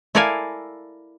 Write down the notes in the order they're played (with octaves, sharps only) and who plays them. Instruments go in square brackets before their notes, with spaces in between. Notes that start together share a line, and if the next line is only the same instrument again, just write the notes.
[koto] E4 A4 A#4 D5 F5 G#5